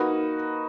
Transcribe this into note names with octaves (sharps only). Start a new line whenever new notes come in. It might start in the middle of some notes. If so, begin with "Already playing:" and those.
Already playing: A#3 D#4 F#4 B4